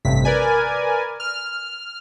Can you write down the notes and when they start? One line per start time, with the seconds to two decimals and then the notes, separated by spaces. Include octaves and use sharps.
0.05 A1 G2 C3 B6
0.25 A#4 B4 D5 G#5
1.20 F6